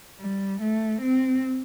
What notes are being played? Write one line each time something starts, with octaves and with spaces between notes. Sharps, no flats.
G3
A3
C4